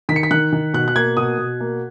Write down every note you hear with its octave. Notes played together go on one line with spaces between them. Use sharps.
D#3 B6
C#7
B6
D#3 F#6
D#3
B2 F#6
F#6
A#3 G#6
B2 D#6
B2
A#3